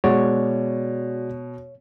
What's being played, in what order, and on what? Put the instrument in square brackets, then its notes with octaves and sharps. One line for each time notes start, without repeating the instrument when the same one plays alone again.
[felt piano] B2 [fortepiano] G#3 [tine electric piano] F#4 D5 [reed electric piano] C#5